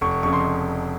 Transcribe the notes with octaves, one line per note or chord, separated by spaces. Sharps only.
F1 C#6
C#6
F2 C#3 C#6
C6